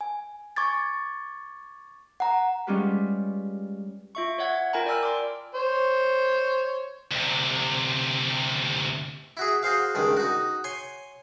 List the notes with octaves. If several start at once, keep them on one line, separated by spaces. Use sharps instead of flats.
G#5
C#6 D6 G#6 A6
F#5 A#5
G3 G#3 C#4 F4 G4 B4
F4 E5 C#6
C#5 E5 F#5 G#6
F4 A#4 G5 G#5 A#5 B5
D5 G5 G#5 E6 F6
C6 D6
C5 C#5
D2 C3
E4 F#4 G#4
F#4 G#4 C5 F5
C#2 G2 D#3 G#3
D#4 F#4
C#5 G#5 C6